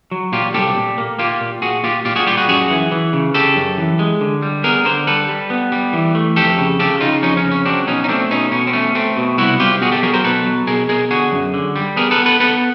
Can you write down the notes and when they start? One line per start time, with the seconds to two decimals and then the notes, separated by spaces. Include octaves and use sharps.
0.11 F#3
0.32 A#2 F4 G4
0.54 C2 G4 A4
0.76 A#2
0.98 A#3
1.19 A#3 F4 G4
1.41 A#2
1.62 A#2 F#4 G#4
1.84 A#2 F4 G4
2.05 A#2 F4 G4
2.16 F#4 G#4
2.27 G3 F4 G4
2.37 F#4 G#4
2.48 F#2 F#4 G#4
2.70 E3
2.92 E3
3.13 C#3
3.35 C#3 G4 A4
3.56 F#2
3.78 E3
3.99 G#3
4.21 D3
4.42 G3
4.64 B3 G#4 A#4
4.85 D3 A#4 C5
5.07 G3 A4 B4
5.29 G3
5.50 B3
5.72 G3
5.93 E3
6.15 A3
6.36 F2 G4 A4
6.58 C#3
6.79 C#3 G4 A4
7.01 C#3 D#4 F4
7.22 F2 C#4 D#4
7.37 C#4
7.44 C#3
7.51 C#4
7.66 F#3 C4 D4
7.87 B2 C#4 D#4
8.04 D#4
8.08 A3 C4 D4
8.30 B2 C#4 D#4
8.52 B2 C#4
8.67 C4
8.73 A3 C#4
8.95 A3 C4
9.17 B2
9.38 C2 E4 F#4
9.60 C2 F4 G4
9.81 B2 F#4 G#4
9.92 G4 A4
10.03 F#3 G#4 A#4
10.13 A#4 C5
10.24 B2 A4 B4
10.46 F#3
10.67 B2 G#4 A#4
10.89 B2 G#4 A#4
11.11 D3 F#4 G#4
11.32 F#2
11.54 D3
11.76 G3
11.96 B3 G#4 A#4
12.11 A4 B4
12.18 B3
12.26 A4 B4
12.40 B3 A4 B4